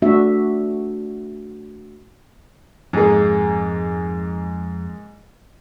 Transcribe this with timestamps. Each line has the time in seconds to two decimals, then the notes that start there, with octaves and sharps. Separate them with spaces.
0.02 A3 D4 F#4 E5
2.93 F2 G#2 A#3 G#4